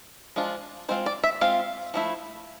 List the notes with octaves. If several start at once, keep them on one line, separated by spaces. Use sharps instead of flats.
F3 G#3 D4 F4
G#3 C4 F4 C5
D5
E5
G#3 C4 F4 F5
F3 A3 E4